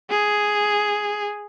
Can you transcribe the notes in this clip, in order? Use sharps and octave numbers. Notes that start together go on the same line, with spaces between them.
G#4